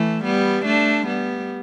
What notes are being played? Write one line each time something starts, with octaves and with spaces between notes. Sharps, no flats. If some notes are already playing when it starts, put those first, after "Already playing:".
Already playing: E3 A3
G3 B3
A3 D4
G3 B3